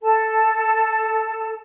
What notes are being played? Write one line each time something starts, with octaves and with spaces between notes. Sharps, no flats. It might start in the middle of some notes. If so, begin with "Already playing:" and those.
A4 A5